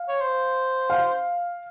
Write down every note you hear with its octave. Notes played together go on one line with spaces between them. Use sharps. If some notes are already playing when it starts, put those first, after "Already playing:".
Already playing: F5
C#5
C5
F5